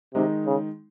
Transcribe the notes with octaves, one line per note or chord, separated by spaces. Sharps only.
C3 D#3 G#3 D#4
C#3